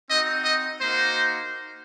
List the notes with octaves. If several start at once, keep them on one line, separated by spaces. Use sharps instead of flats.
C4 D#4 F#4 D#5
D#5
A#3 D#4 F#4 C5